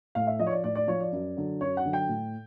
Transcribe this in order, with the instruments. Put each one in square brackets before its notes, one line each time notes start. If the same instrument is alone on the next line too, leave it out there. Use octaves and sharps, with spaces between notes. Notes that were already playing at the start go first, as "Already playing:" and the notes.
[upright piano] A2 F5
E5
F3 D#5
C#5
D5
A2 D5
D5
F3 C#5
D5
F#2
D3 F#3
F#2 C#5
F#5
D3 F#3
G5
A2